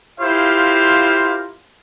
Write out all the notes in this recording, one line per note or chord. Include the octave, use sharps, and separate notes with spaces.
E4 F4 G4 A#4 C5 F5